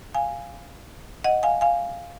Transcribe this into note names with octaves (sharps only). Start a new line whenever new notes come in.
F5 G#5
D#5 F#5
F5 G#5
F5 G#5